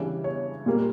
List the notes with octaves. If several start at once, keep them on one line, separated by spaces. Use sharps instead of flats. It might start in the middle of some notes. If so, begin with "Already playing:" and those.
Already playing: C#3 E3 G3 D4
C#5
A#2 G3 A#3